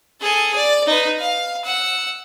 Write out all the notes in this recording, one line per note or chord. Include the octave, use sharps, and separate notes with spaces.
G#4 A4
D5
D#4 B4
F5
F#5 E6